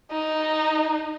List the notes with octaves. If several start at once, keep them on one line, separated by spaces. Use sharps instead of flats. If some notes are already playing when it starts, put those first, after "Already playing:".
D#4